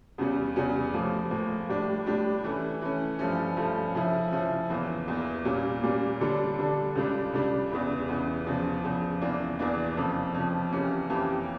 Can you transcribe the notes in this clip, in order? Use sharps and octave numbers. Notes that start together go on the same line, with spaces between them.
E2 C#3 G3 C#4
E2 C#3 G3 C#4
A2 F3 A#3
A2 F3 A#3
A2 G3 D4 G4
A2 G3 D4 G4
E3 A3 C#4
E3 A3 C#4
G2 F3 A3 C#4
G2 F3 A3 C#4
C#3 F3 C#4 E4
C#3 F3 C#4 E4
E2 E3 A#3
E2 E3 A#3
A#2 G3 A#3 C#4
A#2 G3 A#3 C#4
D3 G3 D4 A4
D3 G3 D4 A4
C#2 C#3 G3 D4
C#2 C#3 G3 D4
E2 C#3 E3
E2 C#3 E3
E2 C#3 F3
E2 C#3 F3
E2 E3 A#3 D4
E2 E3 A#3 D4
F2 C#3 F3
F2 C#3 F3
F2 E3 A#3 C#4 G4
F2 E3 A#3 C#4 G4